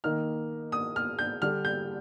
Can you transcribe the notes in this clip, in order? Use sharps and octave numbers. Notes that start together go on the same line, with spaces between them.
D#3 A#3 D#4 F6
D#6
F6
G6
D3 G3 D4 F6
G6